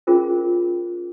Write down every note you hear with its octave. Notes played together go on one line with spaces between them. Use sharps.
C#4 F4 G#4 A#4 C5